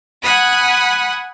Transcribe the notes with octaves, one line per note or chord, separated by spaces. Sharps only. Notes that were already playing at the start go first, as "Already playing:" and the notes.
F#5 G#5 B5 D#6 F#6